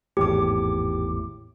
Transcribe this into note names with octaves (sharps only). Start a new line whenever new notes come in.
G#1 E2 A2 G4 D6